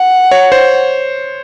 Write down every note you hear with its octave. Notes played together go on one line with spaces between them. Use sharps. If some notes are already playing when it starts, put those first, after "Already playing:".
Already playing: F#5
C#5
C5